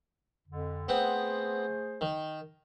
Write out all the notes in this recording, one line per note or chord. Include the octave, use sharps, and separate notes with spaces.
F2 D3
A3 B3 C4 G#4 C5 F#5
D#3